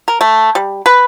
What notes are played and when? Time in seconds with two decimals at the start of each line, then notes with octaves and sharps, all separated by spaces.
0.08 A#4
0.21 A3
0.55 G3
0.86 B4